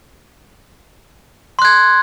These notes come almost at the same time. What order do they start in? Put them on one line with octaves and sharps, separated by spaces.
C6 F#6 G#6